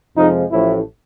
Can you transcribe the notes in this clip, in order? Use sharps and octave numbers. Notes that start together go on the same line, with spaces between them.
F2 C3 F3 G#3 D#4
A1 A2 F3 A3 E4